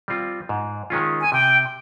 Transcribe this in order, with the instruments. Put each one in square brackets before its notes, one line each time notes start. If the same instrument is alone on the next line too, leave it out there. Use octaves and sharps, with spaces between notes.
[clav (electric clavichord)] G3 C4 F4
G#2
D#3 G#3 C#4 F4
[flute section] G#5
[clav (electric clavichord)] C3 [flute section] G5